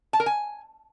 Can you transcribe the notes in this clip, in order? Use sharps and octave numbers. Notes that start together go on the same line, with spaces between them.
A5
A#4
G#5